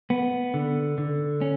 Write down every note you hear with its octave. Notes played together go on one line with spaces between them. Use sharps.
B3
D3
D3
C#4